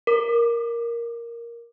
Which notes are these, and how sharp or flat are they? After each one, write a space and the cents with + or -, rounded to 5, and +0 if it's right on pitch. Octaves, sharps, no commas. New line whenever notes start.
A#4 +0 D6 +15